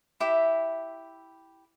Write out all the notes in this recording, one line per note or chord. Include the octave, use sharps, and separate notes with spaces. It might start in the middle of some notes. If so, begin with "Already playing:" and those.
E4 G4 E5